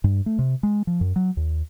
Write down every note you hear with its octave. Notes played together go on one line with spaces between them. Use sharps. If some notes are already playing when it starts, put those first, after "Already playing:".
G2
A3
C3
G#3
F3
F#2
F#3
D#2